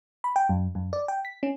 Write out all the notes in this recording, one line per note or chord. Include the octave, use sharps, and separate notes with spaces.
B5
G5
F#2
F#2
D5
G5
B6
C#4